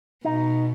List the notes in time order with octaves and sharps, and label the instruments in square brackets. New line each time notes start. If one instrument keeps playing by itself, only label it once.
[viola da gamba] B2 [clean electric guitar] D#4